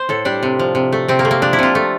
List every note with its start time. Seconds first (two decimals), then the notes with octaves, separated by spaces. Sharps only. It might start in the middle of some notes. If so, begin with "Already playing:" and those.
Already playing: C5
0.09 A2 A4
0.25 G3 D4
0.43 C3
0.59 F3
0.75 C3
0.92 A3
1.08 C3 C4
1.19 A#3
1.25 A3
1.31 A#3
1.42 F3 D4
1.53 E4
1.59 C3 F4
1.75 A3